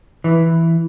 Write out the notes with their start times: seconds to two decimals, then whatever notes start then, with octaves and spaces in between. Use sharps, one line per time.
0.24 E3